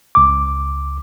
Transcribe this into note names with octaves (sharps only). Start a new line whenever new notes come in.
C#2 D6